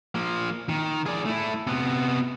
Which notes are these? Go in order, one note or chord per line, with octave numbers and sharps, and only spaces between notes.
F3 A#3
D#3
G#4 D5
A3 E4
C3 B3